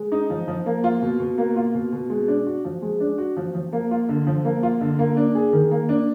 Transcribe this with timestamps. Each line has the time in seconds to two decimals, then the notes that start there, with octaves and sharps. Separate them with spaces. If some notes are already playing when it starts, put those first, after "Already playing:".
Already playing: G#3
0.12 D#4
0.30 F3
0.48 F3
0.66 A#3
0.84 F4
1.02 B2
1.19 B2
1.38 A#3
1.56 F4
1.74 B2
1.92 B2
2.10 G#3
2.28 D4
2.46 F#4
2.65 F3
2.82 G#3
3.00 D4
3.18 F#4
3.37 F3
3.55 F3
3.73 A#3
3.91 F4
4.09 D3
4.27 F3
4.45 A#3
4.63 F4
4.81 D3
4.99 A#3
5.17 D4
5.35 G#4
5.53 D#3
5.71 A#3
5.89 D4